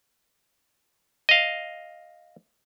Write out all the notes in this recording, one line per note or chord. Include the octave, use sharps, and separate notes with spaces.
D#5 F5